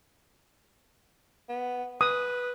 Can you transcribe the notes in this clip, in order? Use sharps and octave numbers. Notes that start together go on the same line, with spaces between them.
B3
B4 D#6